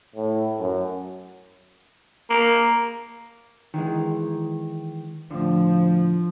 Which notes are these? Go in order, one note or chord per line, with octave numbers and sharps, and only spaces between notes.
A2
F#2
A#3
D#3 E3 G#3
A2 D3 F3